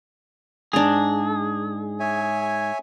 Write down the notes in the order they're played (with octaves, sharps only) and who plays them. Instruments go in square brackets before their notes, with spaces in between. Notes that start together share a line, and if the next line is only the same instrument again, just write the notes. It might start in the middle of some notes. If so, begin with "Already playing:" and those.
[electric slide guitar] G#2 [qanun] D4 A#5 [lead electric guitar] G#4
[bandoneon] C#5 E5 G#5